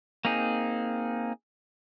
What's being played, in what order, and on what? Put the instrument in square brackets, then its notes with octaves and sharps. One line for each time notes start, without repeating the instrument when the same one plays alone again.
[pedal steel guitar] A#3 C4 D#4 G#4